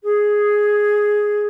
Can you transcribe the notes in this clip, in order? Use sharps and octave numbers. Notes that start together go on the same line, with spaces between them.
G#4